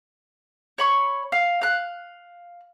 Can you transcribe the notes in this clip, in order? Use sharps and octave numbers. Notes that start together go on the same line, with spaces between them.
C#5 B5 C#6
F5
F5 F#6